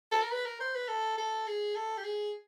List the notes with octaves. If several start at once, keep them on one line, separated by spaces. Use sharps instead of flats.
A4
A#4
B4
A#4
C5
B4
A4
A4
G#4
A4
G4
G#4